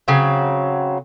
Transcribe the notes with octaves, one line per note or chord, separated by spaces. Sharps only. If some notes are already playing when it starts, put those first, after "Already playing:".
C#3 F#3 C4